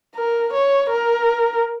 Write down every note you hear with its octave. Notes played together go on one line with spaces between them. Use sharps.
A#4
C#5
A#4